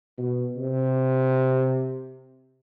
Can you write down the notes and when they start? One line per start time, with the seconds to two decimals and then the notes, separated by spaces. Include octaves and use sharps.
0.18 B2
0.56 C3